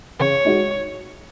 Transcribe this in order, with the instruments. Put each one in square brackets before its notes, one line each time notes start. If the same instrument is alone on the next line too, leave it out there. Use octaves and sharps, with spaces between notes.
[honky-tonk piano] C#3 [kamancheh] C#5
[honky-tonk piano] G#3 D#4 F#4